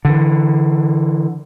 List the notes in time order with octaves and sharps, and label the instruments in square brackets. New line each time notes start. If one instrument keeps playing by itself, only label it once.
[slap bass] D3 E3